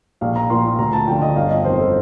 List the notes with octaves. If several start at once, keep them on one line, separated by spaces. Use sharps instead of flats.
A#1 F5
A#5
A#2 F3 C6
A#5
D2 A#5
A5
D3 F3 G5
D#5
G1 F5
D#5
F2 D#3 C5
A4